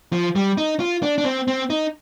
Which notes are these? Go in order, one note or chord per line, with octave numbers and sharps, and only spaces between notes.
F3
G3
D#4
F4
D4
D4
C4
C4
D#4